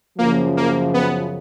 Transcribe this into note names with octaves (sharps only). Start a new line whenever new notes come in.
F#2 C#3 F3 A#3
A#3
B3